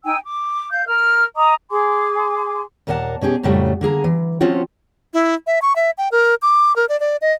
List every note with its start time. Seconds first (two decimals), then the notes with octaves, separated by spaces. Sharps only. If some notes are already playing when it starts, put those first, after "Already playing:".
0.04 D#4 G5 G#5 E6
0.24 D6
0.72 F5 G6
0.87 A#4 F6
1.36 D#5 A#5 D6 D#6
1.70 G#4 G#5 C6 D6
2.87 D#2 A#2 A#3 A#4 F#5 A5
3.21 B2 C#4 G4 G#4
3.43 F2 A2 C#3 F#3 G3 A3
3.81 D3 A#3 G#4 A#5
4.04 E3
4.40 F3 C4 C#4 F4 F#4
5.13 E4
5.47 E5
5.62 C#6
5.76 E5
5.98 G5
6.11 A#4
6.42 D6
6.76 A#4
6.89 D5
7.00 D5
7.21 D#5